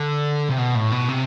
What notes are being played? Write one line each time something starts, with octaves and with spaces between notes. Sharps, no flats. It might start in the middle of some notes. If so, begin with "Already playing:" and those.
Already playing: D3
C3
B2
A2
B2
C3